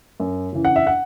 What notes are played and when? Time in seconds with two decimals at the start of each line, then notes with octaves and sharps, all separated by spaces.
0.20 F#2
0.53 C#3 E3
0.65 F#5
0.76 E5
0.87 F#5